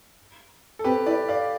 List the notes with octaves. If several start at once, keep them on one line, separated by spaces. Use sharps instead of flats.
A4
C4 G4 B4
E4 B4 D5
D5 F5